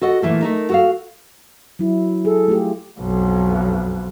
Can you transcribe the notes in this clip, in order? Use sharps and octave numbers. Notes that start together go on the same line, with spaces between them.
F#4 A4 D#5 F#5
A#2 E3 A3 A#3
A3 D#4 A#4
F#4 A4 F5
F#3 E4
G#4 A4
A3 F4 G4
B1 F2